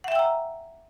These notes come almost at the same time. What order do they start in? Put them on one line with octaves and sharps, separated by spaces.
F#5 E5 G5 E6 A#5